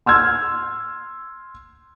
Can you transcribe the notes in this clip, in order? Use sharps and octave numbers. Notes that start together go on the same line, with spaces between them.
C6 E6 F6 G#6